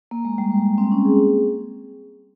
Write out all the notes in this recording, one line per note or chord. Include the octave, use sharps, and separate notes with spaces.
A#3
G#3
G3
G#3
C4
C#4
G#4